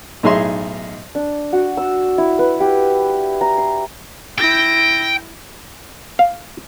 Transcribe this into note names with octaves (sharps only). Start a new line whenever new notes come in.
B1 A2 D#4 G#4 E5 C6
D4
F#4
E6
E4
B4
G4
A#5
C6
E4 G5 A#6
F5